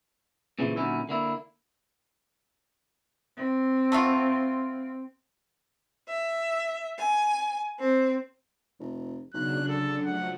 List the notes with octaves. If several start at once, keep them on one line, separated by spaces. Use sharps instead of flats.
A#2 C#3 E3 F3 A3
A#2 D3 F#3 C#4 D#4 E4
D3 A#3 E4
C4
A3 B3 F4
E5
G#5
C4
F1
B1 C#3 F#3 D4 F#6
D3 A4
F3 F#3 A3 F#5